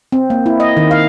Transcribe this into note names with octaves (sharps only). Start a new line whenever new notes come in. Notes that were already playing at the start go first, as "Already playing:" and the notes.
C4
A#3
E4
D#5
D#3
F5